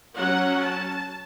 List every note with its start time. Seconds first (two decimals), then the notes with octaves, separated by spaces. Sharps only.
0.15 F#3 C#4 F#5
0.62 A5